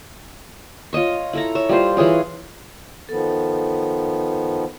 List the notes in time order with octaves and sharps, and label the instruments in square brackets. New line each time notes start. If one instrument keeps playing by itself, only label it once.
[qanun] F4 C#5 D#5 C#6
E4 A4 A#5
C#5 E5
G3 F4 C5
E3 F4 G#4 C#5
[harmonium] D#3 F3 B3 [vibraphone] A4